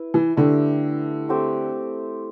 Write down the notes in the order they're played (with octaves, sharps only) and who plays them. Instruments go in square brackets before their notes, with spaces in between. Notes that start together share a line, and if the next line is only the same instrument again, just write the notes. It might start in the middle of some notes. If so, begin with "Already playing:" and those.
Already playing: [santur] E4 B4
[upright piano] E3
[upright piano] D3 [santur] A3 E4 G4
[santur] A3 C4 G4